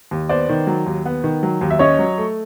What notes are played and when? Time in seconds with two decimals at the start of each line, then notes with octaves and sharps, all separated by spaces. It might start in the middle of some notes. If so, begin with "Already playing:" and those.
0.11 D#2
0.29 B3 C5 D5
0.49 D#3
0.67 F#3
0.86 D#2
1.05 B3
1.24 D#3
1.43 F#3
1.61 D#2
1.70 E5
1.79 C#4 C#5 D#5
1.99 F#3
2.18 A3